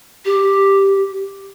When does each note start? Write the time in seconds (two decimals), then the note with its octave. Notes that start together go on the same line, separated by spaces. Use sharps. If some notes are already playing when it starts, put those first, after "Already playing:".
0.25 G4